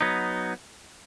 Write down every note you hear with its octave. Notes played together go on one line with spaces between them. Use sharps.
F#3 B3 D#4